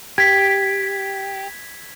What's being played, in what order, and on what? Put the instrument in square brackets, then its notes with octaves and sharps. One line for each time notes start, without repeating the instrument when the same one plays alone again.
[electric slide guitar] G4 [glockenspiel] G#6 B6